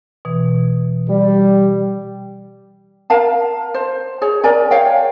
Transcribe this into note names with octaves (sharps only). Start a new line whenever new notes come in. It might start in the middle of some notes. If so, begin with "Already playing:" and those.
B2 E3
G3
A#4 F5 A5
C5
G#4 C#5
A#4 D5 G#5
C#5 F5 G5